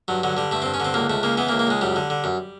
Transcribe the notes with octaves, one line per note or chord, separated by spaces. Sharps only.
G2 F#3
D3 F#3
D3 G3
G2 A3
C4
G2
C#4
D3 C4
C#2 A#3
C#2 A3
C#3 A#3
E3 B3
A#3
C#2
A#3
C#2 G#3
F#2 G3
D3
D3
F#2